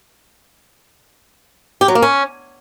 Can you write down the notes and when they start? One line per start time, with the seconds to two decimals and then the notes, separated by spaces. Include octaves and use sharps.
1.81 G4
1.88 F#3
1.95 A#3
2.02 C#4